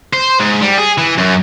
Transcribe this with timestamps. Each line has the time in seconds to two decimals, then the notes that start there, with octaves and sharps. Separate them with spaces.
0.13 C5
0.40 G#2
0.62 G3
0.78 G#4
0.98 E3
1.18 F#2